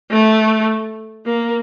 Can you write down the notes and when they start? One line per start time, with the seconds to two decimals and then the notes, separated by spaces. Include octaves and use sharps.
0.11 A3
1.26 A#3